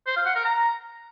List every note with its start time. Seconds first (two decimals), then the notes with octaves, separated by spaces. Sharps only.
0.07 C5
0.16 F5
0.26 F#5
0.35 A#4
0.45 A#5